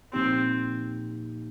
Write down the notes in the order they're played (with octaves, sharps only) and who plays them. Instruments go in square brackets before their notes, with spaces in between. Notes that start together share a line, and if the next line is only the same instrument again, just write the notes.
[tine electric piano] A#2 F3 A#3 D#4 G4 [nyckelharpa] C4